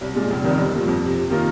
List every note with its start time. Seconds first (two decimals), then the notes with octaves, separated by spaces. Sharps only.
0.01 C2
0.15 A#2 G#3
0.30 F1
0.44 F2 D#3 G3
0.58 G1
0.73 G2 F3 A#3
0.88 F2
1.02 C3 F3
1.17 C3
1.30 D#3 A#3 F4 A#4